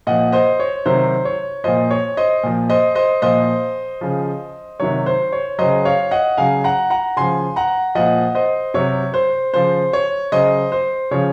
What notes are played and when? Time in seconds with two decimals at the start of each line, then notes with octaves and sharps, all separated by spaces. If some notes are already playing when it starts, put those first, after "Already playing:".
0.07 A#2 F3 D#5 F#5
0.32 C5 D#5
0.60 C#5
0.86 C3 D#3 F#3 C5
1.25 C#5
1.64 A#2 F3 C5 D#5
1.91 C#5
2.17 C5 D#5
2.43 A#2 F3
2.70 C5 D#5
2.95 C5 D#5
3.22 A#2 F3 C5 D#5
4.01 C#3 F3
4.80 C3 D#3 F#3 C#5
5.06 C5
5.32 C#5
5.59 C#3 F#3 C5 D#5
5.85 C#5 F5
6.11 D#5 F#5
6.37 C#3 F#3 F5 G#5
6.64 F#5 A#5
6.90 F#5 A#5
7.16 C#3 F3 G#5 C6
7.56 F#5 A#5
7.95 A#2 F3 D#5 F#5
8.35 C5 D#5
8.74 C3 F#3 C#5
9.14 C5
9.54 C#3 F3 C5
9.93 C#5
10.32 C#3 F#3 C5 D#5
10.72 C5
11.11 C#3 F3 C#5